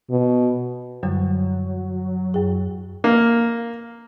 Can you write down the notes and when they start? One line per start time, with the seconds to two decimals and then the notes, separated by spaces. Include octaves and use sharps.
0.10 B2
1.03 F#2 D3 F#3 G3
2.34 F#2 G#4
3.04 A#3